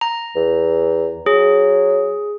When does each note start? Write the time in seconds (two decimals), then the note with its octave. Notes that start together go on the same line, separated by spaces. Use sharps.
0.01 A#5
0.36 E2
1.26 F#3 G#4